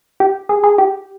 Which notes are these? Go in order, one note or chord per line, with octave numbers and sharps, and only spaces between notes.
G4
G#4
G#4
G4